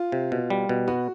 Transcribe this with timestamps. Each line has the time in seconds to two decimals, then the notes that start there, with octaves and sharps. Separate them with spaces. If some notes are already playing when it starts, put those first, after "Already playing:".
Already playing: F4
0.12 C3
0.32 B2
0.50 G3
0.69 B2
0.87 B3 F#4